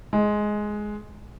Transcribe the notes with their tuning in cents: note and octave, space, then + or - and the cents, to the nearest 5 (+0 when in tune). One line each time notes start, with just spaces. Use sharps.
G#3 +10